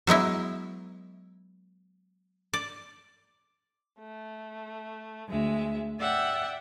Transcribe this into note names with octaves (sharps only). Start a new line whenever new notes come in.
F#3 G#3 B3 E4
D5
A3
D2 G#3 E5
D5 E5 F#5 G5